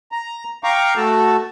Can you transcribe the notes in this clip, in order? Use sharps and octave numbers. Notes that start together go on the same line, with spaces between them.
A#5
F5 G5 A#5 C#6 D6
A3 F#4 A4 A5